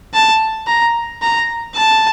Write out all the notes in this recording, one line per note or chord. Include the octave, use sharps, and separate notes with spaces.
A5
A#5
A#5
A5